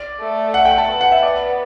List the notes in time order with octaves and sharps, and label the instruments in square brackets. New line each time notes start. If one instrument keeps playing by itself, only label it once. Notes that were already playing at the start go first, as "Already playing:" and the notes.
Already playing: [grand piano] D5
[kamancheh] A3
[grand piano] F#5
G5
A5
[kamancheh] B3
[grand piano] F#5
E5
D5